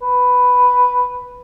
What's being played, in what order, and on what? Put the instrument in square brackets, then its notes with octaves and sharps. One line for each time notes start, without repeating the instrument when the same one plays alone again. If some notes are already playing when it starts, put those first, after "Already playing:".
[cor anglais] B4